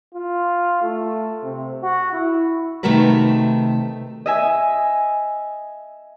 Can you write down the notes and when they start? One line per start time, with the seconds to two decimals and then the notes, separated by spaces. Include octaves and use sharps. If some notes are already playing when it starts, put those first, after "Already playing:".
0.14 F4
0.83 A3
1.43 C3
1.83 F#4
2.13 E4
2.83 C3 D#3 A3 F#4 A#4 B4
4.26 D#5 E5 G#5